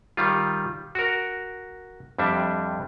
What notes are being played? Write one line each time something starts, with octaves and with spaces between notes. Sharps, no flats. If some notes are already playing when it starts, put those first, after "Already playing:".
D#3 G3 F4
F#4 A#4
F2 G3 D4 E5